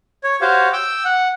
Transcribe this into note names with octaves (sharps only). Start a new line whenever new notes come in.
C#5
F#4 G4 C5 C#5 F5
G5 D6 E6
F#5